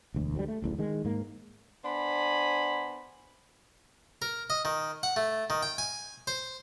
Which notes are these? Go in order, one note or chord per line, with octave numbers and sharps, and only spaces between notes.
E1 D2
D2 F#3 G3
A3
D1 A1 E2
D#3 G#3
G#2 A#3
B3 D4 C5 G#5 B5
A#4
D#5
D#3
F#5
A3
D#3
G5
G#5
C5